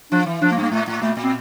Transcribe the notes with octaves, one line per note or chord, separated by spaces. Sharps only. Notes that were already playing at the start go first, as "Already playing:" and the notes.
F3 D4
E3
F3 D4
A#3
G2
A#3
A2 A3
A2
A#2 A3
A#2
C4